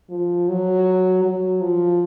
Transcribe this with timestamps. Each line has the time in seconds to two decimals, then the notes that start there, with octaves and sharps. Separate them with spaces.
0.10 F3
0.49 F#3
1.24 F#3
1.61 F3